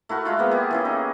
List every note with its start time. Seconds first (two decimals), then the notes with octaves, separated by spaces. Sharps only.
0.09 A3 E4 F#4 A#4
0.25 G#3 E4 F4
0.39 A#3 B3
0.51 G4 G#4
0.71 E3 C#4 E4
0.85 D#4